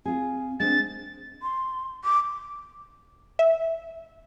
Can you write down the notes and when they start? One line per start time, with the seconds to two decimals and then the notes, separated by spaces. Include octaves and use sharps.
0.05 C4 F4 G#4
0.60 G#3 C4 D4 A6
1.42 C6
2.04 D6
3.39 E5